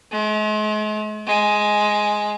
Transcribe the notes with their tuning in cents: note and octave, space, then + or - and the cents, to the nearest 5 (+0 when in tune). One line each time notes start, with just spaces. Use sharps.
G#3 +45
G#3 +10